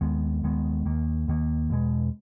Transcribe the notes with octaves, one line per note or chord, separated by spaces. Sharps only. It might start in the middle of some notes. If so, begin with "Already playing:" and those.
D#2 D#3 G#3 B3
D#2 D#3 G#3 B3
D#2 D#3 A#3
D#2 D#3 A#3
E2 B2 G#3